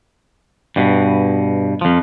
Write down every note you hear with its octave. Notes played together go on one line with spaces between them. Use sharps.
G2 B2
F2 F3